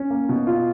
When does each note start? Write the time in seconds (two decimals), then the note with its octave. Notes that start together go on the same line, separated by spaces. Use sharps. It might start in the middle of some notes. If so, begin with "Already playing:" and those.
Already playing: C#4
0.10 A#3
0.29 B2
0.47 F4